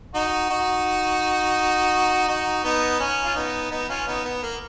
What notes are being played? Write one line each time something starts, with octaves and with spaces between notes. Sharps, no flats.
D#4 F#4
D#4 F#4
D#4 F#4
B3 D#4
C#4
F4
B3 D#4
B3 D#4
C#4 F4
B3 D#4
B3
A#3